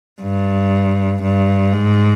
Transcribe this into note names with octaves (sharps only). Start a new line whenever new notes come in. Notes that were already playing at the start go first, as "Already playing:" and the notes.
G2
G2
G#2